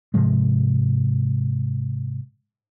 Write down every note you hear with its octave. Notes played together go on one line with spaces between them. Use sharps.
G#2 C3 F3 G#3